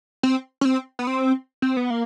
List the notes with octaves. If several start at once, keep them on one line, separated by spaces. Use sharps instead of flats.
C4
C#4
C4
B3
C4
C4
B3
A#3